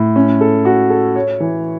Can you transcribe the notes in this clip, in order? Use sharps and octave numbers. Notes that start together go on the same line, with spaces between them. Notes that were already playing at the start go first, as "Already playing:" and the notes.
Already playing: A2
C#4
A4
F#4
A4
C#5
E3